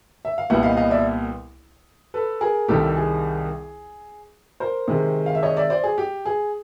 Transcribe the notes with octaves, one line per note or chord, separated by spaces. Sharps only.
E5
F5
C2 A#2 G3 B3 E5 F#5
D#5 F5
D#5 F5
D5 E5
A4 B4
G#4 A#4
C2 C3 D#3 G3 G4 A4
G#4
A#4 C5
C3 D#3 G#3
F5
E5
C#5 D#5
D5 E5
C5 D5
G#4
G4
G#4